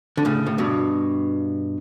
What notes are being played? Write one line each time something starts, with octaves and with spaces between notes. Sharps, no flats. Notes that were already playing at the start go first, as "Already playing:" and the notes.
D3
A2 C#3
A2
G2 B2